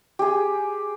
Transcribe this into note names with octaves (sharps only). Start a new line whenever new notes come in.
G4 G#4